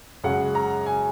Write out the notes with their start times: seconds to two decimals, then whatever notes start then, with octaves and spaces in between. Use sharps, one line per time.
0.24 F#2 C#3 G#3 F#5
0.55 A#5
0.86 G#5